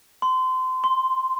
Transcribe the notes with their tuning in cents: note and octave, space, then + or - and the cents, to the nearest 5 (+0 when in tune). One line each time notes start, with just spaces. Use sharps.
C6 -25
C6 +0